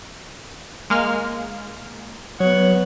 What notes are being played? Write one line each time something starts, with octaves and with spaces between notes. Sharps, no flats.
G#3 A#3 F6
F#3 B3 C#5 F#5